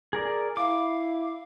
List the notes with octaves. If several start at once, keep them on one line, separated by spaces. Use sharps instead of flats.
G#4 A#4 D5
E4 F5 D6